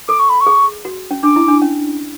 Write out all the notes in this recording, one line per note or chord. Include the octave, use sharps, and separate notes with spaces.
A4 D6
C#6
B5
C#6
G#4
F#4
C#4
D4 D6
E4
D4
C#4